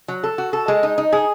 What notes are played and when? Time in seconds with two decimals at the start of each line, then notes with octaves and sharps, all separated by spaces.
0.08 F#3
0.24 A4
0.38 F#4
0.53 A4
0.68 G#3
0.83 D#4
0.98 D#4
1.13 G#4